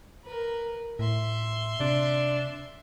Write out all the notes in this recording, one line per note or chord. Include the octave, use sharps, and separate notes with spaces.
A#4 B4
A2 E5 C6
C3 D4